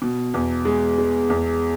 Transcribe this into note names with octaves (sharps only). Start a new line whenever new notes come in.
B2
E2
G#3
G#3
E2